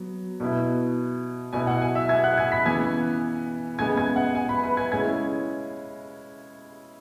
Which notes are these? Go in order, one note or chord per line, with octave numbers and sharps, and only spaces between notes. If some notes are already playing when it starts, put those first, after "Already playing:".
Already playing: F#3 B3
B2 B3 E4
B2 B3 E4 G#5
F#5
G#5
E5 E6
G#5 G#6
F#5 F#6
G#5 G#6
B5 B6
C#3 E3 B3 G#5 G#6
C#3 G#3 B3 G#5 G#6
G#5 G#6
F#5
G#5
B4 B5
B4 B5
G#5 G#6
C#3 G#3 C#4 E4 G#5 G#6